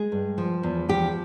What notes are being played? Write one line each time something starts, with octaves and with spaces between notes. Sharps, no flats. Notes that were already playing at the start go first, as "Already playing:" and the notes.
Already playing: G#3 G#4
G2
F3
E2
F3 G4